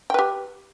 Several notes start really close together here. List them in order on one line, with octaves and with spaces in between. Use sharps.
G5 B4 G4